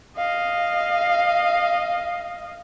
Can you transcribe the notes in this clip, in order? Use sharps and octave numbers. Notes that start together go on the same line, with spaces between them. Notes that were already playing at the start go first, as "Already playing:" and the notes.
D#5 F5